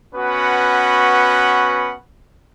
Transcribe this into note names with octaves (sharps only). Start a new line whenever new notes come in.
B3 C#4 F#4 B4 F#5